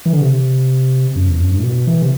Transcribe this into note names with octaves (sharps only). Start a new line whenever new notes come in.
E3
D3
C3
F#2
E2
F#2
G2
A2
B2
E3
C3